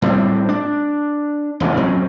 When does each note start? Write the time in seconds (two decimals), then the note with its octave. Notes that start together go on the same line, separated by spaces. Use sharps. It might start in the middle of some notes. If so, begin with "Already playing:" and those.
0.02 A2 G3 A3 C4
0.49 D4
1.60 E1 A1 C3 E3
1.77 F2 F#3 C4 C#4